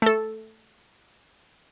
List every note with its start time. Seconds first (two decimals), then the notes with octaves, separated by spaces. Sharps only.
0.02 A3 A4